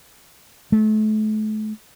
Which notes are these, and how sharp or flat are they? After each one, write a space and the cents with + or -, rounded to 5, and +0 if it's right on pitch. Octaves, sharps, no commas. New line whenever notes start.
A3 -35